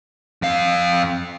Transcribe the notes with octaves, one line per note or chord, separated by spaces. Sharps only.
F2 F5